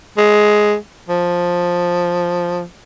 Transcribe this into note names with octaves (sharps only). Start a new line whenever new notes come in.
G#3
F3